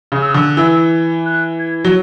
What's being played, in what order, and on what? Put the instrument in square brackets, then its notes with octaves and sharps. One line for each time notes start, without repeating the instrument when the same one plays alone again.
[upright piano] C#3
[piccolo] E6
[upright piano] D3
[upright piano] E3 [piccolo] E6
[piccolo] F#6
G#6
[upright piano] F#3